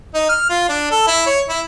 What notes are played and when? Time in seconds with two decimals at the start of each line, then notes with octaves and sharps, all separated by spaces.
0.14 D#4
0.29 F6
0.50 F4
0.69 D4
0.91 A4
1.07 E4
1.26 C#5
1.49 E4